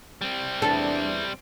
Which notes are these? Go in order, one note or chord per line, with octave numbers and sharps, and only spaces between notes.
G3 C4
E2 D4 A4